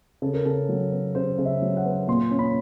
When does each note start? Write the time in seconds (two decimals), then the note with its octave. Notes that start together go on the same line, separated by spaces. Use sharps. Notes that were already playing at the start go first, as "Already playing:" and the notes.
0.22 C#3 A4
0.34 A#4
0.45 C#3 A4
0.69 F#3
0.92 B3
1.15 C#3 C5
1.39 C#3
1.46 E5
1.62 F#3
1.77 F#5
1.85 B3
2.08 A#2 C6
2.31 C#4
2.39 B5